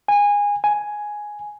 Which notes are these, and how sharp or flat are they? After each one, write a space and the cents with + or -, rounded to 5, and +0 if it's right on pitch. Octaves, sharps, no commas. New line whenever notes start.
G#5 -20
G#5 +5